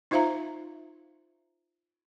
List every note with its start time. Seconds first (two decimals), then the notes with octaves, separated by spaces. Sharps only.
0.11 D#4 F4 C5 E5 F5 A#5